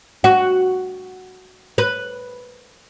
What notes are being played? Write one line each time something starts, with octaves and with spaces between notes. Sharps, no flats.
F#4
B4